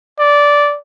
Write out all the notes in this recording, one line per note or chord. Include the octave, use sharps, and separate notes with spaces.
D5